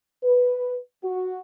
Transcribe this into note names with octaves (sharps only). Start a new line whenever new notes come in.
B4
F#4